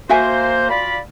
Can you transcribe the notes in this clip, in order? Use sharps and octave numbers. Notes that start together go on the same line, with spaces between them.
A#3 F#4 C5 E5 G#5
F4 D5 B5